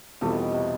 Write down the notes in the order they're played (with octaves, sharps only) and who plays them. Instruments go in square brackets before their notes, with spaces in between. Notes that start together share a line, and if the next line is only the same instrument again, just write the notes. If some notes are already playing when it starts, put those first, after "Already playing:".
[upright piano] E2 B2 G3 C4 F4 [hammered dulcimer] A3
[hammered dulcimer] D#3
C#3
C3